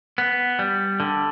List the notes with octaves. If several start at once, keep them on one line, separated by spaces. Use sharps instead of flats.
B3
G3
D3